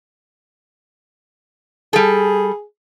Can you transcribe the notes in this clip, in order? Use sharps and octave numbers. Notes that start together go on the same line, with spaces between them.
G3 G#4 A4